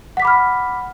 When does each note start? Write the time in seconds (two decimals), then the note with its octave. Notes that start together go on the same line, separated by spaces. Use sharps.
0.17 F#5
0.20 B6
0.22 D6
0.25 B5
0.27 F6